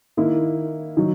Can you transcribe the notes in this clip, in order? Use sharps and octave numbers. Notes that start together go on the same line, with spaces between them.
D#3 A#3 E4
D#3 F#3